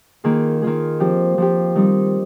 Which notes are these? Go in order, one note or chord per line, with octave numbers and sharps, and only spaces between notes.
D#3 A#3 F4 G#4
D#3 A#3 F4 G#4
F3 C4 G4
F3 C4 G4
D#3 G3 C4 D#4